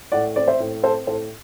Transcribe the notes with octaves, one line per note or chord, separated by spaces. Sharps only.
A2 D5 F#5
C4 D5
C5 E5
A2
C4 A4 C5
A2 A4 C5